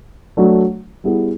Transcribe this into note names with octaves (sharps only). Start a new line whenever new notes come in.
F#3 A3 D4 F#4
G3 B3 E4 G#4